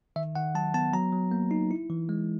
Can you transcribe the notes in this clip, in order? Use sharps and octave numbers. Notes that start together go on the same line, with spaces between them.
D#3 E5
D#3 F#5
F#3 A5
B3 A5
F#3 A#5
F#3
A#3
D#4
E4
E3
G#3